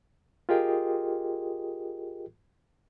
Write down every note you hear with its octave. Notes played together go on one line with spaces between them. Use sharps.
F4 G4 G#4 A#4 D#5 G5